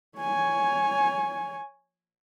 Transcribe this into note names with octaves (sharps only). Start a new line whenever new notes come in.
C#5 G#5